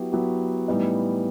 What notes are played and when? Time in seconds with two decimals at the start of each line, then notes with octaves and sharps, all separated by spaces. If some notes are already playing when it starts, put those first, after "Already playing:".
Already playing: F#3 B3 E4 G4
0.12 F#3 B3 E4 G4
0.68 A2 E3 G3 B3 D#4